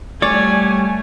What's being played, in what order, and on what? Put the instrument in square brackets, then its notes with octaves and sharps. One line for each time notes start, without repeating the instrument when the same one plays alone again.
[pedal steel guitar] G3 C#5 [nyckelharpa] A3 [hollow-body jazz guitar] D5 [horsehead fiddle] G#5